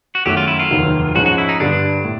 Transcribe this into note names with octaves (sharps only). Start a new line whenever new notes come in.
F#4
F#2 D#3 F#3 A3 G4
F4
E4
F4
F1 D#2 D#3 F#3 A#3
G#2 F3 G#3 C#4 F#4
F#4
E4
D#4
G2 D3 G3 D4
A2